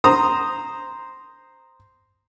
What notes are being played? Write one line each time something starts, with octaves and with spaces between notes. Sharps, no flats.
C5 A#5 D#6